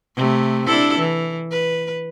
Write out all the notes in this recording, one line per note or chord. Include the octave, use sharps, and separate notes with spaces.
C3 A3
D4 E4 A4
E3
B4